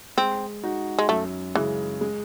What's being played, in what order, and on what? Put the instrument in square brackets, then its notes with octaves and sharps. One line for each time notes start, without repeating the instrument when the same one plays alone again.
[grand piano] G#3 [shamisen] C4
[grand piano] D#4 F#4
[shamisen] G#3
[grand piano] F#2 [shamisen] A3
[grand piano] C#3 G#3 [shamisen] E3
[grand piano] G#3